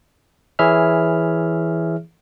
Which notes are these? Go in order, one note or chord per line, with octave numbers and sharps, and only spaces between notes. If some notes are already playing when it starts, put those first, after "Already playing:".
E3 E4 G#4 C#5 E5 F6